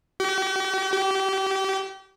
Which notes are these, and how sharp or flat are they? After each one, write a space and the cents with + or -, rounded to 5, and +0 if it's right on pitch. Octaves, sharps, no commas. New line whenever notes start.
G4 -45
G4 -30